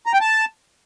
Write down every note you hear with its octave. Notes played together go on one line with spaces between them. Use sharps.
A#5
G5
A5